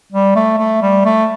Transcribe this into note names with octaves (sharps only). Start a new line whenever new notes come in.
G3
A3
A3
G3
A3